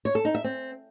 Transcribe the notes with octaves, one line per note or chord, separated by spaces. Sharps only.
C#5
A4
D#4
E5
C4